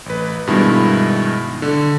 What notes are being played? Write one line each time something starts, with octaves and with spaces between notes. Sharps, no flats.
A1 B4
G2 B2 D#3 G#3 E4
D3